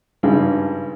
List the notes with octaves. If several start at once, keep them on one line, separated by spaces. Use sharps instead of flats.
G#1 G2 C#3